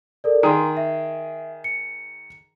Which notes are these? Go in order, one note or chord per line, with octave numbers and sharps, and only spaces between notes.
A4 A#4 D5
D#3 G#4 A#5 C6
E5
C#7